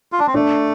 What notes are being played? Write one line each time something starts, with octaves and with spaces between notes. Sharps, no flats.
F4
D4
C4
A3 D4